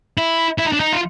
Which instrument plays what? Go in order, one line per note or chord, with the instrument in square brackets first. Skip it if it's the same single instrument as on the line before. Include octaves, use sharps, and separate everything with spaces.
[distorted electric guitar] E4
E4
D#4
D4
D#4
F4